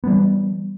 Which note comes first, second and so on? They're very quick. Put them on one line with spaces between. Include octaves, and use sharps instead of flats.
B3 G3 E3